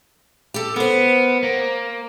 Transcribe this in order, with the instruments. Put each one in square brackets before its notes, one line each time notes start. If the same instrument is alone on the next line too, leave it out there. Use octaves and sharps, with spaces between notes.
[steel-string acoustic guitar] G4 A4
[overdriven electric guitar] B3 [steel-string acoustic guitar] A#4 C5
[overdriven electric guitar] A#3